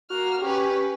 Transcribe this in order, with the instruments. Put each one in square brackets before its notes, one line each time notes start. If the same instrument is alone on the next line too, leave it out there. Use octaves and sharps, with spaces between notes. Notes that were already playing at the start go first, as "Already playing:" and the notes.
[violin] A#3 F6 [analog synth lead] F#4
[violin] C#4 B4 [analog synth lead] G4